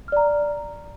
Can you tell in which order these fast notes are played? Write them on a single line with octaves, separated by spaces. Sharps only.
F6 D5 A#5